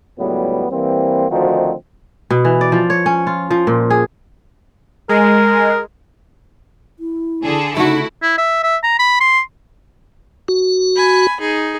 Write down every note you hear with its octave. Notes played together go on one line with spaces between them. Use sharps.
C#2 A2 F#3 G3 B3
E3 G3 A#3 C4
D2 D#3 F3 C4 D#4 F#4
B2
E3
D5
F3
C#5
C#4
F4
F3
A#2
G#4
G#3 A#4
E4
D3 G#4 A4
C#3 A3 D#4 E4 F#4
E4
E5
E5
A#5
B5
C6
F#4
G#5 B5
D#4 G#4